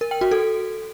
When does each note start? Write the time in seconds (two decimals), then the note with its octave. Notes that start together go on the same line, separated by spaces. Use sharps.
0.01 A#4
0.11 G5
0.21 F#4
0.31 A4